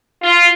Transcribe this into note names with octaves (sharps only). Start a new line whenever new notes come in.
F4